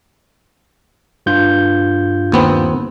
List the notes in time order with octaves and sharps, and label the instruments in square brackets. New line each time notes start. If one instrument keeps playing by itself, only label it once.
[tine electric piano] G2 F4 G6
[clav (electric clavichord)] D#2 B3 C4